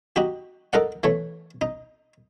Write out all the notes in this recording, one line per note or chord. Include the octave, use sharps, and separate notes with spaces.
D#4 F#4 G4
D#4 A4 A#4 D5 F#5
E3 A3 C#5
D#4